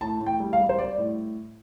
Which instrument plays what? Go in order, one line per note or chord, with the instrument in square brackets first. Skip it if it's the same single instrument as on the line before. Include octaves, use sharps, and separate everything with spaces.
[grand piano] A2 A5
A2
G5
G3
F5
G3
C5
G3 D5
A2